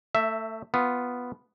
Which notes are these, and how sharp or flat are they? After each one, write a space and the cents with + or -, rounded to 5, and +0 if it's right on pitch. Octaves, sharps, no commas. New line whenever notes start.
A3 +25 E5 +0
B3 +0 F4 +0